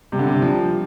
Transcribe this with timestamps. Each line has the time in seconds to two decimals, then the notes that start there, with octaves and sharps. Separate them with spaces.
0.12 C3 G3
0.19 D3
0.27 C3
0.42 F3